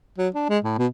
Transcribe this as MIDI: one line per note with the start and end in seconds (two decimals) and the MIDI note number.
0.18 0.29 54
0.35 0.46 62
0.49 0.59 56
0.64 0.76 45
0.78 0.87 47